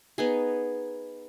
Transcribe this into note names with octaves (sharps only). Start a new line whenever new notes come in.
B3 D#4 G#4